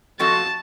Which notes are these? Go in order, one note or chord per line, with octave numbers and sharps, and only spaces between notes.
F3 C4 F#4 A4 D#5 A5